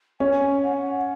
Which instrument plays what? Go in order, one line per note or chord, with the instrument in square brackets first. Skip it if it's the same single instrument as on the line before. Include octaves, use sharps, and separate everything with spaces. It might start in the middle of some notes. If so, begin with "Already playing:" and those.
[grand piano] C#4 [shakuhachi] G#5
[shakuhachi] F#5